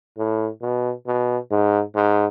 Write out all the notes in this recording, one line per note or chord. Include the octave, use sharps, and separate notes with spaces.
A2
B2
B2
G#2
G#2